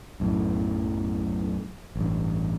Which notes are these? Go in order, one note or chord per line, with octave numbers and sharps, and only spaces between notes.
B1 F#2 A2
A1 G2